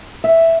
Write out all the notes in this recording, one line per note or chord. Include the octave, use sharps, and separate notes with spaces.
E5